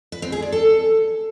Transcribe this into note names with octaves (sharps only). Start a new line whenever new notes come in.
B4
C4
G#4
D5
A4